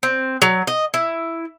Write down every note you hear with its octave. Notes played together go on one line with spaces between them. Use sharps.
C4
F#3
D#5
E4